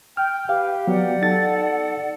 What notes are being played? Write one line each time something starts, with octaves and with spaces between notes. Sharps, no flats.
G5 F6
G4 B4 F5
F#3 B3 D5 F#5
D#4 A4 A6